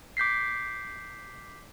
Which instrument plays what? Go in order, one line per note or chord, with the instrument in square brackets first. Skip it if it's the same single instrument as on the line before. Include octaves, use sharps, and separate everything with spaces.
[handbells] D6 G6 B6 C7